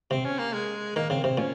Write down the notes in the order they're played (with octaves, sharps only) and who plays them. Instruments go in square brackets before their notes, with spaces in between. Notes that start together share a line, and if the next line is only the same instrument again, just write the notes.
[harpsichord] C3 [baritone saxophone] C4
[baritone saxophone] C#4
A#3
G#3
[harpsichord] D#3 [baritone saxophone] A#3
[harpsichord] C#3 [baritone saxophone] C4
[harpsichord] C3 [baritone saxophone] C4
[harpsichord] A#2 [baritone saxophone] C#4